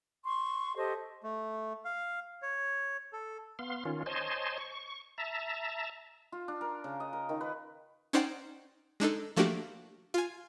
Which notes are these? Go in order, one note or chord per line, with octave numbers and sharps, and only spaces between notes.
C6 C#6
G4 A4 C5 D#5
A3
F5
C#5
A4
B3 F5 C6
D#3 C#4 F4
C5 C#5 D#5 G#5 A5 C6
C#6
E5 A5 A#5
F4
D4
A#4
C#3
D#5
A#4
D#3
B4
C#4 D#4 C5 D5 F#5 G5
G#3 D4 D#4 A4
F3 A3 A#3 D4 F#4 G4
F4 G#5